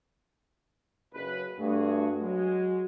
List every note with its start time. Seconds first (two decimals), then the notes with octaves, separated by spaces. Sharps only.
1.14 F#1 B4
1.60 G2 A3 F#4 G#4
2.22 F#3 G#3 F#4